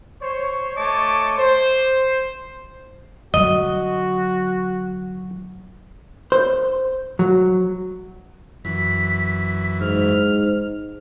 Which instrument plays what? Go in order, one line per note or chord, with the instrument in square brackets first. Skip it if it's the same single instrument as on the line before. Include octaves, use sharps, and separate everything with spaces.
[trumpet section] C5 C#5
A3 C#5 D#5 A5 C#6 D6
C5
[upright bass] D3 F#3 [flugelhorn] F#4 [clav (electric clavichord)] D#5
[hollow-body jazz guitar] C5
F#3
[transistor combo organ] F#2 E3 [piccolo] B6
[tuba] G#2 [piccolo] F6